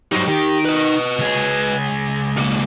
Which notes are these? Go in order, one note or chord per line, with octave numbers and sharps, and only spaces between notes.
F#3 G3 D#4 C5
D#3 G4
B4 D#5
C#2 G#4
B1 A#3